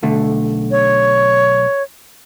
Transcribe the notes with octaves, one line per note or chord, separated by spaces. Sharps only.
B1 D3 A3
C#5